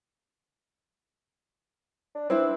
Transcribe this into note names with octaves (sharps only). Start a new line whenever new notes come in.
D4
C4 D4 E4 B4